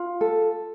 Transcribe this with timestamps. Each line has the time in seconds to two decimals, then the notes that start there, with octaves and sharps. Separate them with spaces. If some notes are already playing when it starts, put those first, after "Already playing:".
Already playing: F4
0.21 A4